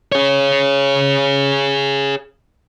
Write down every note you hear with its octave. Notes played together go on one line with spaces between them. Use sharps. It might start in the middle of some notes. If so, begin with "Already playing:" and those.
G#4 C#5